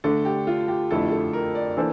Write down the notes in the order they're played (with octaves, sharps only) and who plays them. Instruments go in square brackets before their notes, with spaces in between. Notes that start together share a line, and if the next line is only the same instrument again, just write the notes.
[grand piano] D3 A3 D4 [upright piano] A4
[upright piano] G4
F4
G4
[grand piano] F2 D3 A3 E4 [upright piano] A4
[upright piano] A4
A#4
D5
[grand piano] E3 A#3 D4 A4 C5 [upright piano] D5